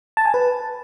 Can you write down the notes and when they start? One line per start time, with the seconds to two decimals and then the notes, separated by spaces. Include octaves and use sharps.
0.17 A5
0.25 G#5
0.34 B4